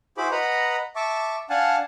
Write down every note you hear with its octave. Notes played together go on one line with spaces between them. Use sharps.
E4 F#4 G#4 C5 B5 D6
B4 D#5 F#5 A#5 B5
E5 A5 C#6 D6
D4 F5 F#5 G#5 A5